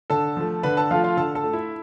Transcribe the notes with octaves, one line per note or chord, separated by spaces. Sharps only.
D3 A4 A5
F3 A3
D3 B4 B5
A4 A5
F3 A3 F4 F5
F4 F5
D3 A4 A5
A4 A5
A3
E4 E5